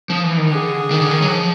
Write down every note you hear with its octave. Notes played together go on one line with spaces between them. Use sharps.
F3
E3
D#3
D3 G#4
D#3
D3
D#3
F#3
F3